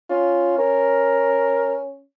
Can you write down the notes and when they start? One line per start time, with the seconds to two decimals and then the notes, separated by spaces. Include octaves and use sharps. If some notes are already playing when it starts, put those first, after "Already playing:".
0.10 C#4 F4
0.58 C#4 A#4